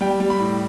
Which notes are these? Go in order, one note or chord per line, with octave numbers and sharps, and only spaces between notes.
G3 G5
G3
B5
A2